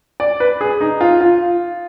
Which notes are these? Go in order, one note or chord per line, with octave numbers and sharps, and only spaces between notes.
D5
B4
G#4
D#4
F4
F4